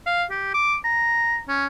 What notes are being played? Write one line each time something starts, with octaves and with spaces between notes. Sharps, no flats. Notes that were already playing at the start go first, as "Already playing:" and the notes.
F5
G4
D6
A#5
C#4